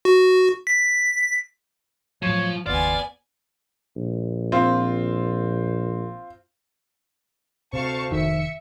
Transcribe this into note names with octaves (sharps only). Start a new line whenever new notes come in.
F#4
B6
A2 F3 F#3 C#5
F#1 D#2 B3 F4 D5 G#5
A#1
C4 F4
D2 C3 C5 F5 A5 C#6
F1 D#3 E5 C#7